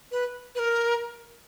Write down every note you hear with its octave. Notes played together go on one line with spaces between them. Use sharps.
B4
B4
A#4